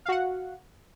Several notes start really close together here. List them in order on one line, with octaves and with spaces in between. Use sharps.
F5 F#4 F#5